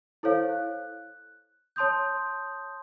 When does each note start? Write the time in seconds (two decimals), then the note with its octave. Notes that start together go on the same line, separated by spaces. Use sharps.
0.23 E4 A4 C5 C#5 F5
0.49 F#6
1.76 C#5 A5 C6 D#6 G6